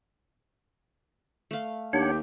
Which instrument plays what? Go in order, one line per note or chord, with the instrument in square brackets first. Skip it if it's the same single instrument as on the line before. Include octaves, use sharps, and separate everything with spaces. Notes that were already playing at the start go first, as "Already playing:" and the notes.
[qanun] A3 F5
[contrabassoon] D#2 [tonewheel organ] D4 C#5 F#5 [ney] G4